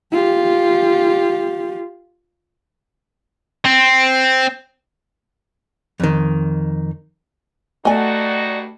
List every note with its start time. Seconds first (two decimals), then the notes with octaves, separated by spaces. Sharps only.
0.12 F4 G4
3.65 C4
6.00 F2 D#3
7.85 G2 A3 D#4 F#4 D5 D#5 G#5